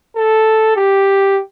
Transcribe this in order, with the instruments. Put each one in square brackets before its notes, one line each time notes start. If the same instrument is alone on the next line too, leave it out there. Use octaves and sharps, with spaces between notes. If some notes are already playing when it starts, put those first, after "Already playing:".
[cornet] A4
G4